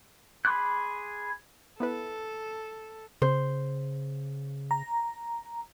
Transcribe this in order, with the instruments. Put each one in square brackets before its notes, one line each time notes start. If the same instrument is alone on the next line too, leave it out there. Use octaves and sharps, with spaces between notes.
[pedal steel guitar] G#4 B5 C6 D6 F#6
[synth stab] B3 E4 B4 [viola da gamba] A4
[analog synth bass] C#3 [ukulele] C5
[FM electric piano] A#5